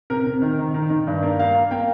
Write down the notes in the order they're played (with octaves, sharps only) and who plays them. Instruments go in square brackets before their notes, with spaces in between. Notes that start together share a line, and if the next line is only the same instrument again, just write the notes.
[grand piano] C3 A#4
C3
D#3
D#3
D#3
D#3
G2
A#3
A#3 F5
A#3
A#3 G5